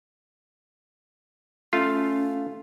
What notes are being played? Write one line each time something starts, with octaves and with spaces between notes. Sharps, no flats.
A3 C#4 F4 F5